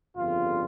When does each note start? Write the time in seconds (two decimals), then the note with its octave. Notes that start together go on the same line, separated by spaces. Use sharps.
0.16 G1 F2 C#3 G3 F4